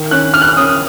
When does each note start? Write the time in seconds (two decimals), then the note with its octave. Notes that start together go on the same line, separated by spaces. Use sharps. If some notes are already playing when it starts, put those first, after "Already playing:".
Already playing: D#3
0.11 C#4 F#6
0.34 C#4 F6
0.42 F#6
0.49 F6
0.57 C#4 D#6